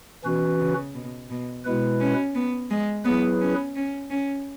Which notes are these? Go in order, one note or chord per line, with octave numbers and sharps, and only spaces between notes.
B2 E3 C#4 F#4 B4
C#3
B2
B2
B2 G#3 B3 E4 B4
C#4
B3
G#3
F#3 B3 E4 G#4 B4
C#4
C#4
C#4